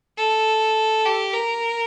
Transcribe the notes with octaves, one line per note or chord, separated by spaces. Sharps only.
A4
G4
A#4